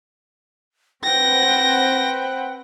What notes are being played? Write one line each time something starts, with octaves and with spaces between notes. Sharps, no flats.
C4 B4 F#5 G5 A#6